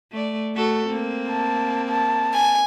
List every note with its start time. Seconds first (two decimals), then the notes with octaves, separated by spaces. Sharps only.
0.12 A3 D5
0.55 A3 F#4 A4
0.86 A#3 C4
1.29 A5
1.89 A5
2.34 G#5